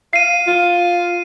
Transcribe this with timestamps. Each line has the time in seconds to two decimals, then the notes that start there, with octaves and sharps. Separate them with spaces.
0.13 F5 C7 D#7
0.47 F4